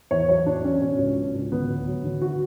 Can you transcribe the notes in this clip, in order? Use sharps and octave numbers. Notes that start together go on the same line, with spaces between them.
E2 C#5
F#3 C#5
E2 D4
F#3 C#4
B2 C#4
C#2
F#3
C#2
D3 B3
D2
F#3
D3
F#4